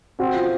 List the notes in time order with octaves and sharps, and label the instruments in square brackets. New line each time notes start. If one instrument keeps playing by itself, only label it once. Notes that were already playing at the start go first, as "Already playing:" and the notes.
[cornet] C4 [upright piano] F#4
[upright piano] F4